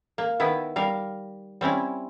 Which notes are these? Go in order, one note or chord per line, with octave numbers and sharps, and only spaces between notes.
A#3
D#3 B3 E4 B4
G3 A#4 F5
G3 C4 C#4 E4